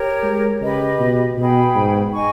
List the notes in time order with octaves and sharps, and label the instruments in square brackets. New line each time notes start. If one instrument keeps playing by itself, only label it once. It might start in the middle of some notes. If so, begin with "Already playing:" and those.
Already playing: [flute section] G4 A#4 C#5
[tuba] G#3
[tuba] C#3 [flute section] G4 B4 D#5
[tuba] B2
[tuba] B2 [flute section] G#4 B4 G5 B5
[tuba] G#2
[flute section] D#5 G#5 C#6